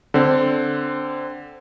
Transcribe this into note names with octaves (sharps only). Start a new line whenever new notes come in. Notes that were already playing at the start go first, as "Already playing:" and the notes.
D3 C4